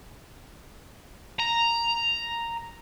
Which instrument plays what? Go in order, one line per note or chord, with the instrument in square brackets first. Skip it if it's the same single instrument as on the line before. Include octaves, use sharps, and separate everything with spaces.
[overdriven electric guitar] A#5